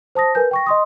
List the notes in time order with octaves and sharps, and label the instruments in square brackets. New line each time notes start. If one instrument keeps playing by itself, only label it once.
[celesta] C5 A5 D#6 A#6
A#4 B4 G#5 G6
G5 C#6 A#6
D#5 C6 D#6